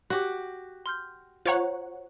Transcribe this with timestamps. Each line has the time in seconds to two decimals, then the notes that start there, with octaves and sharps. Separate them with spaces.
0.10 F#4 G4
0.86 C6 F6 G6
1.46 F4 C5 C#5 F#5 A#5